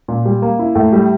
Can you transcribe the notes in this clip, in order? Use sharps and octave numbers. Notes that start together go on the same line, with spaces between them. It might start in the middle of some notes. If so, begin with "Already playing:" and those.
A#2
G3
A#3
E4
A2
G3